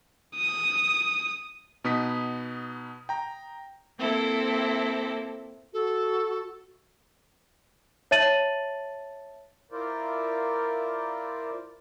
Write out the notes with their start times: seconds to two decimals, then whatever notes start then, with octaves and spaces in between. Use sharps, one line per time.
0.37 D#6
1.84 B2 B3 D#4 D#6 B6
3.09 G5 A#5
3.97 A#3 C4 E4 A4
5.74 F#4 A4
8.11 C#5 E5 A5 A6 D#7 F#7
9.72 E4 F4 A#4 C5 D5